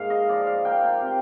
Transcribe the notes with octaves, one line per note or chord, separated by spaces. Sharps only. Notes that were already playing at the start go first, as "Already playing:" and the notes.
Already playing: G#2 A#3 F5
D#5
F3 D5
F5
A#3 G5
G5
C3